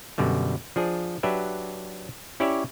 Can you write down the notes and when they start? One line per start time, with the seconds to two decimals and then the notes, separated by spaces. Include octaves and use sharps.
0.18 F#2 B2 D3 G3
0.76 F3 D4 G#4
1.23 F#3 D4 G4 B4 E5
2.40 C#4 E4 G4 C#5 D5 E5